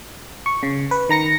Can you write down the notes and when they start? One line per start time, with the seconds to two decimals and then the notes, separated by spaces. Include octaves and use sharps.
0.46 C#6
0.63 C#3
0.91 B4
1.09 D#3 A#5 A#6 C#7